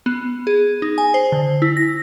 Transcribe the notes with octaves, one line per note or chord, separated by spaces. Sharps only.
B3
G#4
D#4
G#5
C5
D3
E4
A#6